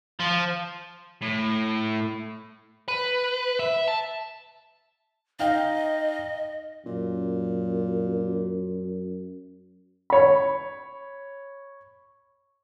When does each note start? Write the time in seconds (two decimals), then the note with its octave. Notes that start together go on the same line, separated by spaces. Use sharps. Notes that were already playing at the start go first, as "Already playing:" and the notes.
0.20 F3
1.21 A2
2.88 B4
3.59 E5
3.88 A5
5.39 D#4 D#5 F5 G5
6.86 F#2 A#2
10.10 C#5 B5